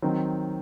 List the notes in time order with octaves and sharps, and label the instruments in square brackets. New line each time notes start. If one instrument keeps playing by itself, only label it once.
[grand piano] D#3 F#3 C4